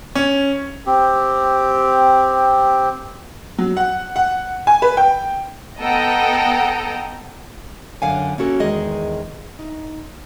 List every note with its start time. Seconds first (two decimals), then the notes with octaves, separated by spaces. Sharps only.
0.15 C#4
0.86 C4 G4
3.58 F#3
3.77 F#5
4.16 F#5
4.67 G#5
4.82 B4
4.97 G5
5.81 B3 A4 D#5 F#5 G5 A#5
8.02 F#2 D3 F5 F#5 G#5
8.38 A#3 C#4 F#4 A4
8.60 E2 D#3 G#3 G#4 D#5
9.59 D#4